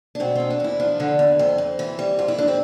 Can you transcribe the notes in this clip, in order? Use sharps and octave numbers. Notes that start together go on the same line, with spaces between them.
D4
B2 C4
E2 C4
D4
E2 E4
F3 D4
D3
E2
F2 C4
F2
E3
G3
F2 F4
E4
F2 D4
C4